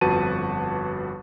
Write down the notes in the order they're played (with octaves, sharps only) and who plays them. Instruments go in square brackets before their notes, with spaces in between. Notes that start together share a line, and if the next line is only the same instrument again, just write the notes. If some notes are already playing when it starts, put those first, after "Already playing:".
[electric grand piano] G1 F2 F#4 B4 A5 D#7